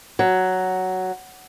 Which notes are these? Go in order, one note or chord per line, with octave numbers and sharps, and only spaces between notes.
F#3